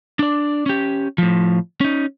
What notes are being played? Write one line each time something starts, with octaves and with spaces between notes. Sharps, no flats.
D4 D5
C#4 G4
A2 F3
C#4 D#4